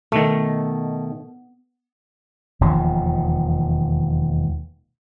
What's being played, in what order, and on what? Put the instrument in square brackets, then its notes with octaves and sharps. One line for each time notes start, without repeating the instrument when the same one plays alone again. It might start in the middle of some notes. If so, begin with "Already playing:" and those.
[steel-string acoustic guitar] B2 [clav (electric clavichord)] D#3 A3
[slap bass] E1 D#2 D#3 F3